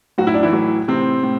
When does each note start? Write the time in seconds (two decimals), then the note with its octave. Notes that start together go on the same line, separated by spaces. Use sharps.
0.18 A2 F#3 F#4
0.27 E4
0.34 D4
0.43 E3 E4
0.52 A2 F#3
0.88 A2 C3 E3 C4
1.23 A2